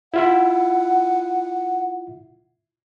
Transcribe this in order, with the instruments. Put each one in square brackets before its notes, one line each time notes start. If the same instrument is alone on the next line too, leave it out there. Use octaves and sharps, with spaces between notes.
[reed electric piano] E4 F4 E5 [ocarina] F#5